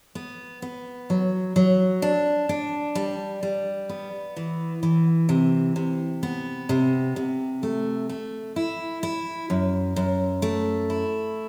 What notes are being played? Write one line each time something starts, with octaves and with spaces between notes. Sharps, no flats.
B3
B3
F#3
F#3
D4
D4
G3
G3
B3
E3
E3
C3
C3
B3
C3
C3
A3
A3
E4
E4
F#2
F#2
A3
E4